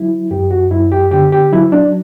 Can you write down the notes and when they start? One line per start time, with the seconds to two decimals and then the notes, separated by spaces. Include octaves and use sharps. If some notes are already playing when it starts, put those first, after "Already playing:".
Already playing: F#3 E4
0.31 F#2 G4
0.51 F#4
0.71 F#2 E4
0.92 G4
1.11 D3 G4
1.32 G4
1.52 F#3 E4
1.72 D4